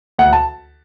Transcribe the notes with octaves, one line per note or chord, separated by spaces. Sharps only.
D2 F#5
A5